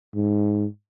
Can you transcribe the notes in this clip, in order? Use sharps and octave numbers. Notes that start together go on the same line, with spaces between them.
G#2